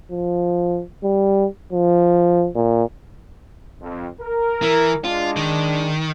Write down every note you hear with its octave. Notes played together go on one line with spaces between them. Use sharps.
F3
G3
F3
A#2
F2
A#4
E3
G#3 D4 F4
D#3